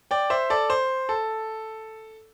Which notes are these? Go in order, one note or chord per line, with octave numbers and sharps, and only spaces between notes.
D5 G5
C5 E5
A4 D5
C5
A4